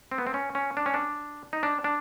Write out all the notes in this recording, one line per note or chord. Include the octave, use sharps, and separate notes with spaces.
C4
B3
C4
C#4
C#4
D4
C#4
D4
D#4
D4
D4